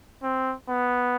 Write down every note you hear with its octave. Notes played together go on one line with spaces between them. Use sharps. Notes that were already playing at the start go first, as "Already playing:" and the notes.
C4
B3